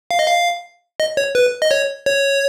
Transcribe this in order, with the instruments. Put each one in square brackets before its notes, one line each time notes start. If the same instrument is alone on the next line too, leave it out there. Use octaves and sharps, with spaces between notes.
[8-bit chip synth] F5
D#5
F5
D#5
C#5
B4
D#5
C#5
C#5